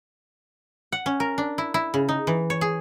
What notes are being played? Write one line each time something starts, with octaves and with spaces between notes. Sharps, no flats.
F#5
C#4
A#4
D4
E4
E4
C#3
D#4
E3
C#5
G#4